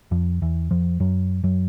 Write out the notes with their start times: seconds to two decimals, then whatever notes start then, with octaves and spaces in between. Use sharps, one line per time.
0.11 F2 F3
0.42 E2 E3
0.71 F2 F3
1.00 F#2 F#3
1.44 F#2 F#3